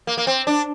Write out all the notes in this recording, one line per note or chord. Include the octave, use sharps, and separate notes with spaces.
A#3
A#3
C4
D4